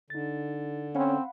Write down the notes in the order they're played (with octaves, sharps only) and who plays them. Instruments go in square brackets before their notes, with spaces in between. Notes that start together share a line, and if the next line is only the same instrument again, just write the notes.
[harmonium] D3 [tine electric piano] D#4 A6
[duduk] C4 [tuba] C#4 [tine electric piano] F5 F#5 B5